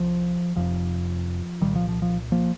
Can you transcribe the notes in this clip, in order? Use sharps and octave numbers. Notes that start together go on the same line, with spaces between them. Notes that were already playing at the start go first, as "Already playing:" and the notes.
Already playing: C2 F3
F1 F2 C3 F3
C2 A#2 D#3 G3
F3
F3
F3
F3 A#3